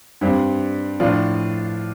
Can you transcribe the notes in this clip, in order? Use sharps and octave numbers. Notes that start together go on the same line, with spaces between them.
G2 G3 C4
A2 F3 D4 F4